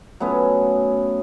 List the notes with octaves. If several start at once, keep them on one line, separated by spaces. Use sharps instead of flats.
F#3 A3 B3 C#4